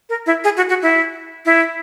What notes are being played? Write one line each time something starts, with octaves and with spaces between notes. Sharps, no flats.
A#4
E4
G#4
F#4
F#4
E4
E4